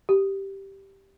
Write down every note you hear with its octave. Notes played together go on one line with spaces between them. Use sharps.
G4